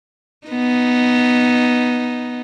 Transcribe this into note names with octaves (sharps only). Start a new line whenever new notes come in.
B3 D#4